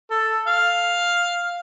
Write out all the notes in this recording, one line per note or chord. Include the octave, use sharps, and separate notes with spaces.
A4
F5